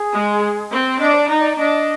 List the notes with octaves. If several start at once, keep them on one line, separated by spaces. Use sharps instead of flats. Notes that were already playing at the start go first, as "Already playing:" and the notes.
Already playing: G#4
G#3
C4
D4 D#5
C5
D5
D#4
D5
D4 D#5